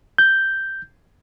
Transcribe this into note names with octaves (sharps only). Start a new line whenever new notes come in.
G6